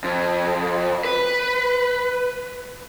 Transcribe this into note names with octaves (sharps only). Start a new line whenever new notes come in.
F2
B4